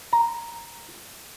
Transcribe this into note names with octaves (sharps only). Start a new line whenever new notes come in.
A#5